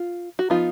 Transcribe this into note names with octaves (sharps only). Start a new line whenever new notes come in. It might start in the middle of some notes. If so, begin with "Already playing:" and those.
Already playing: F4
F#4
F3 B3 D#4 F4